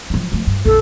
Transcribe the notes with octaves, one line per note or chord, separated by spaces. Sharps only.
F3 G#3
F3 A3
G2
A#1 F2 A4